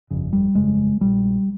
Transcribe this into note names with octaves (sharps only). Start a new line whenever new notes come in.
G1 F2 C#3
G3
G1 F2 C#3 G#3
A#1 A#2 G3